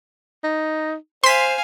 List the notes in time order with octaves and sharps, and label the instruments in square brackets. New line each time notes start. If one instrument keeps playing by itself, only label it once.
[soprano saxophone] D#4
[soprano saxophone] C5 [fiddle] F5 G#5 [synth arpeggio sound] C6 B6